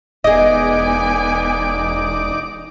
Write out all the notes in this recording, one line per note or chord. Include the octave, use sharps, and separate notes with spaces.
E1 B3 D#4 G#4 D5 D#5 G#5 D6